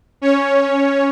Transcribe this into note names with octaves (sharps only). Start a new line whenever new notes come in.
C#4 C#5